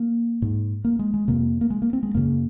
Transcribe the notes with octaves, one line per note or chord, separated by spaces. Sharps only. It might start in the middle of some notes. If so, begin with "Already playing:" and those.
Already playing: A#3
G#2
A#3
G#3
G#3
F2 C3 A#3
A#3
G#3
A#3
C4
G#3
F#2 C#3 A#3